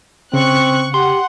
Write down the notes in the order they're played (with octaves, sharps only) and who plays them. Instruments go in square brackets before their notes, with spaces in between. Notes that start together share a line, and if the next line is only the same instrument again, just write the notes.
[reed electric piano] C#3 [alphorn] C4 [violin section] C#6 F#6
[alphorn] G4 [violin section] F#5 [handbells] C6